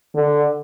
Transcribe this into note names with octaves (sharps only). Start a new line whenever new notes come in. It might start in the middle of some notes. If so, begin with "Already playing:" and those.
D3